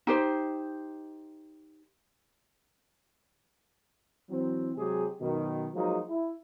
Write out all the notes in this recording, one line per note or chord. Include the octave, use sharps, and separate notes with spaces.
D#4 G4 C5
E3 F#3 C4
C3 F#3 G#3 G4 G#4
F#2 B2 D#3
F3 F#3 G#3 A#3 D#4
E4